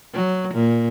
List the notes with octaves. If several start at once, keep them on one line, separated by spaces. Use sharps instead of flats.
F#3
A#2